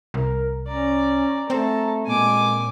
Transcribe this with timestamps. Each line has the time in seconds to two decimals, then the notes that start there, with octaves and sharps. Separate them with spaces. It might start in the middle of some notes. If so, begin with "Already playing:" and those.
0.14 C2 A#4
0.68 C#4 D5 A#5
1.50 A3 C4 A4
2.07 A#2 G#3 G#5 D6